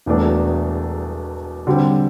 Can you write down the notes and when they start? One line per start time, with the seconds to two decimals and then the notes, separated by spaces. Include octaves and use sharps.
0.06 E1 E2 B2 A3 D4
1.67 D3 G3 C4